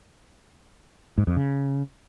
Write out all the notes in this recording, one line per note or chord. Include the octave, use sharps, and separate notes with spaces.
G#2
F2
C#3